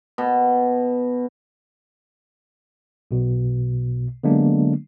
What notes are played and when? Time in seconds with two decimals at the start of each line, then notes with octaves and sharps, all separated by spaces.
0.18 B2
3.11 B1 B2
4.23 D3 F#3 G#3 A#3 B3 D4